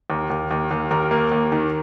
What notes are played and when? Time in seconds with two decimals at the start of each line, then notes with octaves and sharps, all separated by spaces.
0.10 D#2
0.30 D#2
0.51 D#2
0.71 D#2
0.91 D#2 A#4
1.11 A#3
1.31 D#2
1.52 D#3